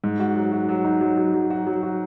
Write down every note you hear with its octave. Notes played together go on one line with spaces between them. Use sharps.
G#2
F#4
F#3
F#4
F#3
D#4
F#3
F#3
F#3
F#4
F#3
F#4